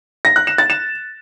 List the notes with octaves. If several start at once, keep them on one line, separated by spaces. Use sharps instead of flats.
A#6
F#6
E7
A6
E7